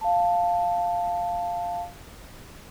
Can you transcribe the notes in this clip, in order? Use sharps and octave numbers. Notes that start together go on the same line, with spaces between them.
F5 A5